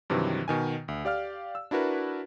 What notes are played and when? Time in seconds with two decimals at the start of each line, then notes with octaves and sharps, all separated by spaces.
0.10 G2 C3 D#3 E3 F#3
0.48 B2 D#3 G#5
0.88 D2
1.05 G4 D5 F5 F6
1.55 E6
1.71 D4 E4 F#4 A#4 B4